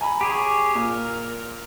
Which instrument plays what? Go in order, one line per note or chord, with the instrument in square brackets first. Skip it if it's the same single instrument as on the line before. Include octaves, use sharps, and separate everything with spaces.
[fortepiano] G#5 A#5 B5
[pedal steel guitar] G4 G#4 C#5
[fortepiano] A#2 [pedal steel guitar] A#4